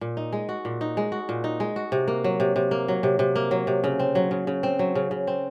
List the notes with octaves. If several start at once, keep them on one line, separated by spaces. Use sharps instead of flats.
A#2
D#4
G#3
F#4
A#2
D#4
G#3
F#4
A#2
D#4
G#3
F#4
C3
A#3
F#3
C3
C3
A#3
F#3
C3
C3
A#3
F#3
C3
C#3
C4
F#3
C#3
C#3
C4
F#3
C#3
C#3
C4